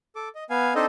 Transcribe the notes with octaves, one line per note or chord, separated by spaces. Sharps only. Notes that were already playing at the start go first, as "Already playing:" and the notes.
A4 D6
D#5
B3 F5 G#5
C4 D4 D#4 A4 C5 D#5